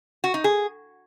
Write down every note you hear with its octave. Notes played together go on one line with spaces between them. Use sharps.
F#4
D#4
G#4